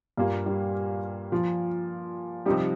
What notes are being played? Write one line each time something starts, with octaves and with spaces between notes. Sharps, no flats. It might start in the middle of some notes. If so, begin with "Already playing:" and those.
G2 A#2 A#3 F4
G3
F3
C3 F3 G3 D#4 G4